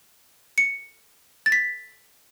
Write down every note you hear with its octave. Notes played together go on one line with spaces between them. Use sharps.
C#7
A6
B6